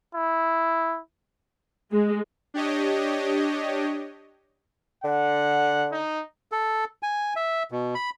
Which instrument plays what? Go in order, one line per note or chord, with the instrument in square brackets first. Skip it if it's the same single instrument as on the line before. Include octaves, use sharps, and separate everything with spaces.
[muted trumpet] E4
[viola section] G#3
[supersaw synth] D4 G4 C#5 D#5
[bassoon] D3 [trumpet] F#5
[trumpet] D#4
[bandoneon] A4
G#5
E5
B2
B5